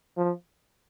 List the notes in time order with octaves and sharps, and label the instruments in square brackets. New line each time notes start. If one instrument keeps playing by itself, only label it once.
[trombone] F3